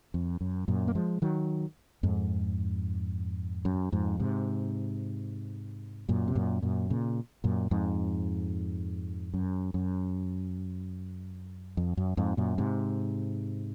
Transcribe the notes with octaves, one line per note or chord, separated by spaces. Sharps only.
F2
F#2
F#2 A#2
A#3
F3 G#3
D#3 F#3
F2 G#2
F#2
F2 G#2
G#2 C3
F#2 A#2
C3
F#2 A#2
F#2 A#2
A#2 C#3
F#2 A#2
F2 G#2
F#2
F#2
F2
F#2
F2 G#2
F#2 A#2
G#2 C3